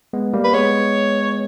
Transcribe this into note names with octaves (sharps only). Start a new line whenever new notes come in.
G#3 B3
G3 A#3
B4
G#3 B3 C#5